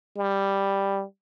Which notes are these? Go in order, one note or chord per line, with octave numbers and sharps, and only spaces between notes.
G3